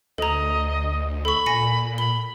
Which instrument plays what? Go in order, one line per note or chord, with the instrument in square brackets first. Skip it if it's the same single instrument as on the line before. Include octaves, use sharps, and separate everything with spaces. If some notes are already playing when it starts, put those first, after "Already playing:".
[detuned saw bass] D2 [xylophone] A4 A#5 [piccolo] D#5
[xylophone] A4 C#6 [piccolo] B5
[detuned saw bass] A#2 [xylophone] G#5 A#6 C#7
[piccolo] B5 [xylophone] G7